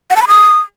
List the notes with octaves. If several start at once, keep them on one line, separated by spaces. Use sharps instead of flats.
F#5
A5
B5
D#6